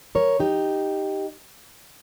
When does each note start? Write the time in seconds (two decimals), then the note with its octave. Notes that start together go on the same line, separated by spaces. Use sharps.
0.15 A#4 C#5
0.40 D#4 G4